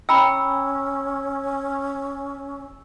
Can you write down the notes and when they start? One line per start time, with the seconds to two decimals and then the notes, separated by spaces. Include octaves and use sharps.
0.09 C#4 G5 A#5 B5 E6